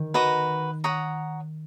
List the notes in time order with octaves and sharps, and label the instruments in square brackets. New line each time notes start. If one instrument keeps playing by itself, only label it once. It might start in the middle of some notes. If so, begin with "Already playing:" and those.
Already playing: [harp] D#3
[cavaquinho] F#4 B4 D#5 A#5
C#5 F#5 A#5 D#6